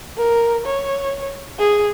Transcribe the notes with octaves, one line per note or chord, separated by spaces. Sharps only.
A#4
C#5
G#4